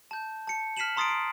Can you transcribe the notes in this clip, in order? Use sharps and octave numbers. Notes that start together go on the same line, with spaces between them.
A5 G6
A5 C#7
F6 B6 C7 D#7 E7 F#7
A#5 C6 D#6 A6 C7 D7
C7 D7